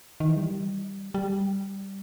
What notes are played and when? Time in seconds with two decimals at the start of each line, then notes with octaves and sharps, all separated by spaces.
0.20 D#3
0.28 E3
0.37 G3
1.14 G3